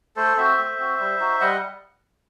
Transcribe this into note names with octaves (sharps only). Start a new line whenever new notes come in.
A3 A4 C5
C4 F#4 C5 E5
A3
C4 F#4
G3
D#4 F#4
G3 D#5 F#5